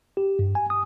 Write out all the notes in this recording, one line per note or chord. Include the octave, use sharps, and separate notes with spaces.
G4
G2
G#5
D#6